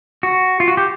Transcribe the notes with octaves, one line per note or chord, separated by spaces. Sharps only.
F#4
F4
F#4
G4